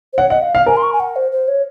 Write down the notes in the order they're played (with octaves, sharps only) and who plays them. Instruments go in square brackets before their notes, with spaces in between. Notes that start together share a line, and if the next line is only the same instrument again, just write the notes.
[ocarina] C5
[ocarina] C#5 [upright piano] F#5
[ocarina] D#5 [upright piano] F#5
[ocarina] F5
[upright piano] F5
[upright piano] A#4 [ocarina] G#5
[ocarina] C6
C#6
G#5
F#5
C5
C5
C#5